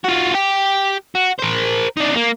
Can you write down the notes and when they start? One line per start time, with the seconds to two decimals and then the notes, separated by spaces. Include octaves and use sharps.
0.05 F4 F#4
0.34 G4 G5
1.15 F#4
1.40 A#4 C5
1.97 D4 D#4
2.16 A#3